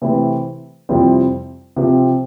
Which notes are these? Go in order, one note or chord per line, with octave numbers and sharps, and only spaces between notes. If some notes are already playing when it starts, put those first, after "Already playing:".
C3 E3 A3 C4 E4
F2 C3 G3 C4 E4
C3 F3 C4